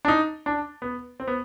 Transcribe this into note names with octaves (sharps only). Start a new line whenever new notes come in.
D4
D#4
D4
B3
C4
B3